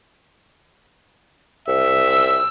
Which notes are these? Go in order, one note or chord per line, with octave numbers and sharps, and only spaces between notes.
C2 E5
E6